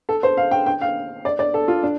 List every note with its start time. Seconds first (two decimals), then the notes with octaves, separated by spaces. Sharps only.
0.09 A4
0.23 C5
0.37 F5
0.51 G5
0.66 G5
0.81 F5
1.25 D5
1.39 D5
1.54 A4
1.68 F4
1.83 D4